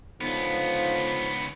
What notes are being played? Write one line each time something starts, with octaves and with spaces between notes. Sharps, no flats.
C#2 D3 F3 B3 D#4